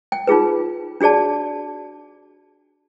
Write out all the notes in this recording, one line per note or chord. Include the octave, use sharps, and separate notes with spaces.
G5
D#4 F4 G#4 B4
D4 F#4 G#4 D5 A5